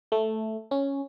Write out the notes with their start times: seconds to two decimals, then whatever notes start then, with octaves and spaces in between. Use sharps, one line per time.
0.12 A3
0.71 C#4